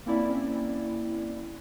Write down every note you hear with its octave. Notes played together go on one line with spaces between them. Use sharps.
A#3 C4 C#4 E4 D5